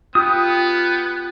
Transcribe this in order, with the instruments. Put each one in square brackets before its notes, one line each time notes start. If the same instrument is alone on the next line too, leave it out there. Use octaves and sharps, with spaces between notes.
[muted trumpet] B3 [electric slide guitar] F4 G4 [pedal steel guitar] D#6